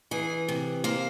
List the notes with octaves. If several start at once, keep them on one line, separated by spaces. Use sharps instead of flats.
E3 G#4
C3
A#3 C5